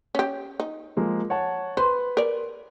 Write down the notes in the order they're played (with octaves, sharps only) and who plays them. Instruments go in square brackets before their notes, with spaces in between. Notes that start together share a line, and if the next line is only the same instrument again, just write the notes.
[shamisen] C#4 G4
D#4
[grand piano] F3 G#3 A#3
C#5 F#5 A5
[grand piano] B4 [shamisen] C5
[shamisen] A#4 D5